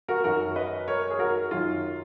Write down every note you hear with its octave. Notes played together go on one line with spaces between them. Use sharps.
F#4 A#4
F#2 D#3 F#3 F#4 A#4
B4 D#5
A#4 C#5
G#4
F#4 A#4
F#2 D#3 F#3 F4